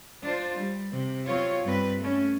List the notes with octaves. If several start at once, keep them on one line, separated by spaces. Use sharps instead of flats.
D4 F4 C5
G3
C3
F#3 C4 F4 C#5
G2 C4 B4
A3 C#4